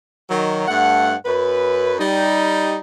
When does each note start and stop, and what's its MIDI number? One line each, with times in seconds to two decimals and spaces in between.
0.29 0.65 51
0.29 0.65 54
0.67 1.13 43
0.67 1.13 57
0.67 1.13 78
1.25 1.94 42
1.25 1.94 71
1.99 2.77 55
1.99 2.77 63